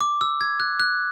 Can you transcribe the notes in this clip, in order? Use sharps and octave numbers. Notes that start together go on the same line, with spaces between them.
D6
E6
G#6
F#6
F#6